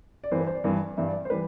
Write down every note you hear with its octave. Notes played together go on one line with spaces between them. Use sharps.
D5
G2 E3 G3 C5
B4
C5
D5
G2 E3 G3
G2 E3 G3 E5
D5
C5
E3 G3 B4